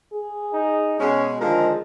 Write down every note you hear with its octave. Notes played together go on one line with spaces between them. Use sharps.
G#4
D#4
B2 G#3 C#4
D3 D#3 F3 G#3 A#4